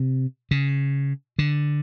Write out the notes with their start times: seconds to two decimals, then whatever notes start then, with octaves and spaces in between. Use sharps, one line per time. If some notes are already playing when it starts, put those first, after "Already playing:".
Already playing: C3
0.51 C#3
1.39 D3